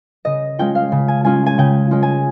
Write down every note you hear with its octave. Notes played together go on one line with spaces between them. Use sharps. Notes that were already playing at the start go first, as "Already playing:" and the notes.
C#3 D#5
G#3 C#4 F4 G5
F5
C#3
G#5
G#3 C#4 F4 G#5
G#5
C#3 G5
G#3 C#4 F4
G#5